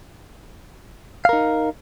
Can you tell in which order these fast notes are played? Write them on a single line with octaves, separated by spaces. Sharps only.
F5 A#4 D#4